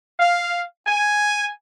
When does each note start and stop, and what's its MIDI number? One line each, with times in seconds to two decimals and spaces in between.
0.20 0.61 77
0.87 1.49 80